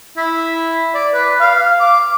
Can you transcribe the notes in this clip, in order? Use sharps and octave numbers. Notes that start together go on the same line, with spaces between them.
E4
D5
B4
F5
D6